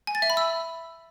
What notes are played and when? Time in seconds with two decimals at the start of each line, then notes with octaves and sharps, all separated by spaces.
0.07 G#5
0.15 A6
0.22 E5
0.30 B5
0.37 E6